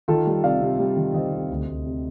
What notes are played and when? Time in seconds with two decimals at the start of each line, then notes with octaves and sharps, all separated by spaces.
0.08 D#3 F4 A4
0.27 G3
0.44 C3 D5 F5
0.61 C3
0.79 G3
0.97 D#3
1.14 D#3 C5 D#5
1.32 C3
1.50 D2
1.67 D2
1.85 C3